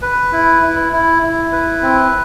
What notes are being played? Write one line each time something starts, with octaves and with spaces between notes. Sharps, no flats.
B4
E4
E4
E4
E4
B4
C4